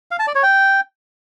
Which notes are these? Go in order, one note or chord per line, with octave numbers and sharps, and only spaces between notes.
F5
A5
D5
C#5
G5